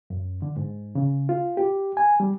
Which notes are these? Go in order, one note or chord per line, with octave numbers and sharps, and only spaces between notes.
F#2
D3
G#2
C#3
F4
G4
G#5
G3